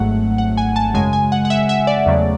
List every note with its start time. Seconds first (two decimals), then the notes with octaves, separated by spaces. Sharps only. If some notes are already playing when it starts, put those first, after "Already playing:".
Already playing: G#1 G#2 F#3 A3 F#5
0.38 F#5
0.57 G#5
0.76 A5
0.94 F#2 C#3 G#3 G#5
1.13 G#5
1.32 F#5
1.45 F#5
1.50 E5
1.69 E5
1.87 D5
2.06 E2 C#3 F#3 A3